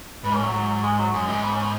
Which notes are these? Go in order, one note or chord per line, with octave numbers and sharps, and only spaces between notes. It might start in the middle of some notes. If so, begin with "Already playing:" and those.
G#2 B4
C#4
A2 F#3
G#2 F#3
F#3
G#3
F#3
F#2 G#3
G#2 G#3
B3
C#4
B3